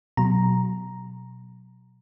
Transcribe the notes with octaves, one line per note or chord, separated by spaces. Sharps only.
B2 F#3 A#5